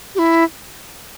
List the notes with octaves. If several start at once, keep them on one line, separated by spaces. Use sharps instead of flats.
G4
E4